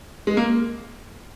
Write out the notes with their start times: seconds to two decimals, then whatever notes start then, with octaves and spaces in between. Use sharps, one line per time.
0.27 G#3
0.37 A#3